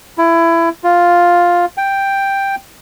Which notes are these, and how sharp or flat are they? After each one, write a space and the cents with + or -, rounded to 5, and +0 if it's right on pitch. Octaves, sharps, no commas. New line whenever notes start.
E4 +20
F4 +5
G5 +5